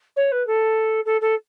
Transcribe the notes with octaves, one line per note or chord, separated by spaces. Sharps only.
C#5
B4
A4
A4
A4